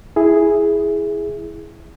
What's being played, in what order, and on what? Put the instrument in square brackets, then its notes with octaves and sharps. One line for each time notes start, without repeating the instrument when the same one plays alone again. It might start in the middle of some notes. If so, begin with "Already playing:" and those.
[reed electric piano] E4 G#4